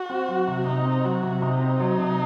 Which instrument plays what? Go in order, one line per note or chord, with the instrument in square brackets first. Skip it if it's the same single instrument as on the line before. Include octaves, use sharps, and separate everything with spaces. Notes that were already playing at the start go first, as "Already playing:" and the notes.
Already playing: [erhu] F#4
[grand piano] C4
F#3
C3
[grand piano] C3 [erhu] D#4
[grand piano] C4
[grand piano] F#3 [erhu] F#4
[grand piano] C3
[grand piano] C3 [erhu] D#4
[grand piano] C4
F#3
C3